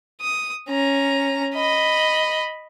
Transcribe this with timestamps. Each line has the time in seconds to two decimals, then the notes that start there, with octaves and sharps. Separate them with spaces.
0.21 D#6
0.69 C#4 A#5
1.55 D#5 B5